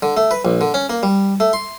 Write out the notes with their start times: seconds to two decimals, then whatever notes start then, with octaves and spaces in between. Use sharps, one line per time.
0.03 D3
0.17 A3
0.31 B4
0.45 A#1
0.61 D3
0.74 C#4
0.90 A#3
1.03 G3
1.40 A3
1.53 C6